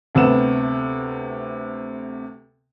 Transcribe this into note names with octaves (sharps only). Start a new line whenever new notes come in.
D2 C3 B3 E7